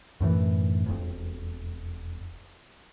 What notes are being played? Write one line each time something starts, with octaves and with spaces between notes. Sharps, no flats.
F#2 A2 E3
E1 F2